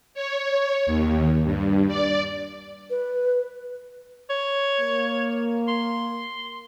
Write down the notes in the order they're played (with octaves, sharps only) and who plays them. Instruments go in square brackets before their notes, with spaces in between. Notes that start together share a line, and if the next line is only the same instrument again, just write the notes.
[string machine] C#5
D#2
G2
D5
[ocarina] B4
[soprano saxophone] C#5
[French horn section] A#3
[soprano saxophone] C6